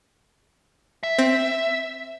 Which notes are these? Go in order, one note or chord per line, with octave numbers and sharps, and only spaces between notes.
E5
C4